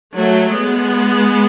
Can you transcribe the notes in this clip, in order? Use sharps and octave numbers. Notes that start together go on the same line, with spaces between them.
F#3 A3
G#3 B3